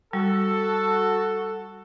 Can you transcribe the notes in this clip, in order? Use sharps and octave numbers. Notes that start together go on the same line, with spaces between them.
G3 F#4 A4